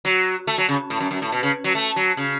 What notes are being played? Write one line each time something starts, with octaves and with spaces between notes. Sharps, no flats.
F#3
A3
F#3
C#3
A2
F#2
F#2
A2
B2
C#3
F#3
A3
F#3
C#3